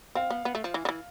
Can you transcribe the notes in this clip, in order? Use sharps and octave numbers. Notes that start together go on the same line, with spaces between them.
C4 F5
B3
B3
A3
F3
E3
D3
E3